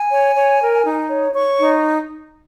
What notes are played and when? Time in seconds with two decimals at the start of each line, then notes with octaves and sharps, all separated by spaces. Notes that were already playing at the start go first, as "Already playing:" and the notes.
Already playing: G#5
0.11 C#5
0.36 C#5
0.61 A#4
0.85 D#4
1.10 C#5
1.34 C#5 C#6
1.59 D#4